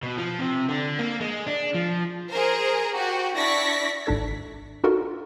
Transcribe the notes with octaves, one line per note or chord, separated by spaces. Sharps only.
B2
F3
C3
D3
A#3
G#3
D4
F3
G#4 A#4 C5
F#4 G4
D4 E4 D5 C#6 A#6 B6
G#1 G#2 D4 A4 G#6
B6
D4 D#4 F4 F#4 A4 A#4